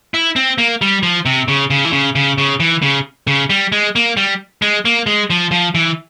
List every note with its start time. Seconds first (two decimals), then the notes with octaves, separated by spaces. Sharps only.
0.14 E4
0.36 C4
0.58 A#3
0.82 G3
1.03 F3
1.26 C3
1.48 C#3
1.70 C#3
1.85 E3
1.93 C#3
2.15 C#3
2.38 C#3
2.60 E3
2.82 C#3
3.27 C#3
3.50 G3
3.72 G#3
3.96 A#3
4.17 G3
4.62 G#3
4.85 A#3
5.06 G#3
5.30 F3
5.51 F3
5.75 E3